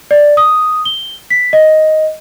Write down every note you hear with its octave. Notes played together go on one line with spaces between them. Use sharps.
D5
D#6
G7
B6
D#5